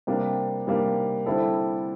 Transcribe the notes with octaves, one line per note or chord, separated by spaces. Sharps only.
C3 G3 A#3 D4 G4
C3 G3 A#3 D4 G4
D3 G3 C4 E4 A4